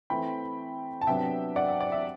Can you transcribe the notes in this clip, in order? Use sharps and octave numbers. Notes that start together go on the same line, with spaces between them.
E3 A3 C4 G5 B5
A5
C3 F#3 B3 D4 E5 G5
D5 F#5
E5
D5
E5